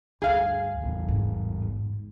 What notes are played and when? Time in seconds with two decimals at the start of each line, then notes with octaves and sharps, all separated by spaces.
0.22 D2 G2 G#4 F5
0.82 A1 E2 A#2
1.08 G#2